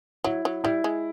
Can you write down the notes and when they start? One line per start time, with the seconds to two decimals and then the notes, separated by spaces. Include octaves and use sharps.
0.24 F#3 E4
0.45 F#3
0.64 G3 E4
0.84 G#3